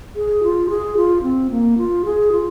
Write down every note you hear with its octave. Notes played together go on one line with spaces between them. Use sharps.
G#4
F4
G#4
F4
C4
A#3
F4
G#4
F4